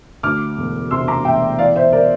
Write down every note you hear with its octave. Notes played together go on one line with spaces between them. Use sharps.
D2 D6 F6
E1
C3 C6 E6
A#5 D6
E1 E5 G5
E3 D5 F5
C5 E5
A#4 D5